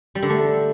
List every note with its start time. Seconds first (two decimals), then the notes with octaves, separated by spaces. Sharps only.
0.15 G3
0.22 D3
0.30 A3